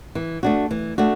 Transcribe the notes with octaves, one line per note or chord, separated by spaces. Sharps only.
E3
A3 D4 F#4
E3
A3 D4 F#4